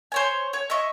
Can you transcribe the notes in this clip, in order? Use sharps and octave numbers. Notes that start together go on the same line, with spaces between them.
C5 C#5 G#5
C#5
D#5 E5 C#6